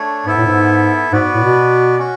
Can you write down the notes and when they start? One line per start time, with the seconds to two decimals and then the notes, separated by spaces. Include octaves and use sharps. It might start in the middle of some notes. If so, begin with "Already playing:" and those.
Already playing: A3 D4 C#5
0.25 G#2 B3 E4 A4 E5
0.36 A2
0.47 G#2
1.12 G#2 B3 F#4 B4 D5
1.34 A2
1.45 B2
1.99 C#4 F#4